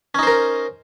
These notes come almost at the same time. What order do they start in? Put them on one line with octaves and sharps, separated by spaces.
C#4 D#4 C5 A#4